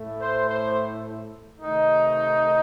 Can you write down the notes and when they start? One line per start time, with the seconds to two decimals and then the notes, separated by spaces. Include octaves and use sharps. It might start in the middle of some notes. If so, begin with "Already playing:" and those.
Already playing: A2 A3
0.19 C5
0.49 C5
1.61 C3 D#3 A3 D#4